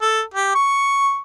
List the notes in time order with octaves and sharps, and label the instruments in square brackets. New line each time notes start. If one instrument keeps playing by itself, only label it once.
[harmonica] A4
G4
C#6